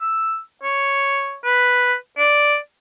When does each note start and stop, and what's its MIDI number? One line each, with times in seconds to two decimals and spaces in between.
0.01 0.39 88
0.63 1.37 73
1.44 1.95 71
2.18 2.56 74